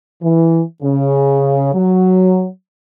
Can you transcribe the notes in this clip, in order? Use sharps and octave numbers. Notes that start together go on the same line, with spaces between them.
E3
C#3
F#3